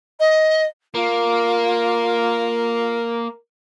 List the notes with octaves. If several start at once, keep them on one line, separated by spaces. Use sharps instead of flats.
D#5
A#3 F4 A#4